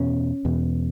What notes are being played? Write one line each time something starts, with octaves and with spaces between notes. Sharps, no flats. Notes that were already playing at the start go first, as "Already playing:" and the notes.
Already playing: E2 B2 C#4
E2 B2